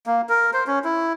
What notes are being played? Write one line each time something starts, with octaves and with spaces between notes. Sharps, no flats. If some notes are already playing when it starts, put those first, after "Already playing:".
A#3
A#4
C5
C#4
E4